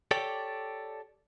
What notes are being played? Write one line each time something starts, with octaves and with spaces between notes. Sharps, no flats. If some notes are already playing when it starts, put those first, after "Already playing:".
G4 A4 C#5 D5 G5